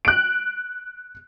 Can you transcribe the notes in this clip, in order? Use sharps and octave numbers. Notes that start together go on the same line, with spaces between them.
F#6 D7